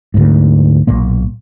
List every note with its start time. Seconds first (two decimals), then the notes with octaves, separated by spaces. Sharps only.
0.14 D2 G#2
0.87 B1 A#2 A#3